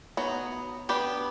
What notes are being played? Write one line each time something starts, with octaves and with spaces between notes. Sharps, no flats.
F#3 B3 D#4
B3 D4 G4 B4